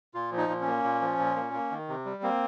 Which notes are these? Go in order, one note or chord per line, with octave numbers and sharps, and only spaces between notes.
A#2 F4
F3
D#4
A#2
C#4
A#3
A#2
F3
A#2
A#3
A#3
D#3
C3
G3
A#3 C4